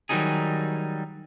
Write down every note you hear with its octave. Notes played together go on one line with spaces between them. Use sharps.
D#3 F#3 G3 D#4 G#4